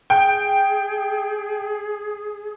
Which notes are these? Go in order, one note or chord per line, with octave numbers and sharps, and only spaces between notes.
G#4 G5